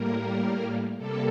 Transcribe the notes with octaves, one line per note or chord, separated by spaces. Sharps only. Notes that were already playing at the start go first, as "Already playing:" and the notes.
Already playing: A2 G3 A#3 A#4
C3 G3 A#3 A4